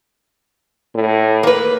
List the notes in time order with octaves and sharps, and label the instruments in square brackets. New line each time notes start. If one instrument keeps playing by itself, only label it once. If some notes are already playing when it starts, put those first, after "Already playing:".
[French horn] A2
[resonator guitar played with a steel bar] A#3 B4